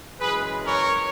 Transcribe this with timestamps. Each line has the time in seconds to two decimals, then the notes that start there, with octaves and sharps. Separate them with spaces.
0.19 F#2 E3 G#3 G#4 B4
0.66 A#4 C#5